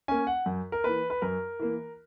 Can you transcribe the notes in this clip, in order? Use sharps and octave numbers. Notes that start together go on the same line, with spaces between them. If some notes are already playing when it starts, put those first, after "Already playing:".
A#3 C#4 G#5
F#5
F#2
A#4
E3 A#3 B4
B4
F#2 A#4
E3 A#3